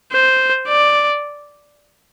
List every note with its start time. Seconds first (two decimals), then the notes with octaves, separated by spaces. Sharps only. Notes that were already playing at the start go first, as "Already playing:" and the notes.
0.12 C5
0.68 D5